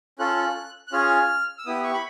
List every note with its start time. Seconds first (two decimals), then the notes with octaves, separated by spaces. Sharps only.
0.19 C#4 F4 A4 F#6
0.88 F#6
0.92 C#4 F4 G#4 F6
1.58 E6
1.66 B3 E4 G4 D#6
1.84 C#6
1.94 B5